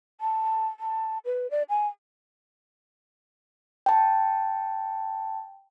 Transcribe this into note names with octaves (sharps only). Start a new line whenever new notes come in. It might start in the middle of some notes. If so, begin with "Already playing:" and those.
A5
A5
B4
D5
G#5
G5 A5